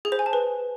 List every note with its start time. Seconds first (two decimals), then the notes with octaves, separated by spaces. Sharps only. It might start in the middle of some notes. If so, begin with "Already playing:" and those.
0.05 G#4
0.12 C5
0.19 G#5
0.26 A5
0.33 B4